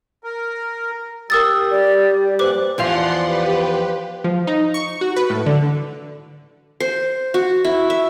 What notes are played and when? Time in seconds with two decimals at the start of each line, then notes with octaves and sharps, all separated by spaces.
0.24 A#4
1.30 G3 A#4 D#6 E6 A6
1.71 G4 D5
2.17 G4
2.39 F#2 A#2 B4 C5 D6 F#6
2.78 E2 F3 D5 F5 F#5 C6
3.27 G4 B4
4.24 F3
4.47 D#4
4.74 C#6
5.01 F#4
5.16 B4
5.30 A2
5.46 D3
6.80 C5
7.34 F#4
7.65 E4
7.90 E5